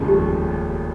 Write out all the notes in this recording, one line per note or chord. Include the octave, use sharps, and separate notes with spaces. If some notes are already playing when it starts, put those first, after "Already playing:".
Already playing: F1 D#2 C#3 F3 G#3
G4